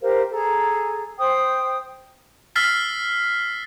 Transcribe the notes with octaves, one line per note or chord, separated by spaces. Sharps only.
G4 A#4 C5 F5
G#4 A4 A#5
C5 G5 D#6
E6 F6 A6 B6 C7